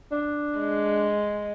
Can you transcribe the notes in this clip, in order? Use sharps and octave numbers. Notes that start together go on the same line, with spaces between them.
D4
G#3